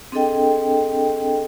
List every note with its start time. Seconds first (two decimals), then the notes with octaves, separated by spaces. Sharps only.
0.12 C4 D4 G#4 A4 D#5 G5